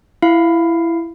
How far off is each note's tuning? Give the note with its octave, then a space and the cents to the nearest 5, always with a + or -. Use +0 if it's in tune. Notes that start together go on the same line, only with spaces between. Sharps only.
E4 +15 F5 +0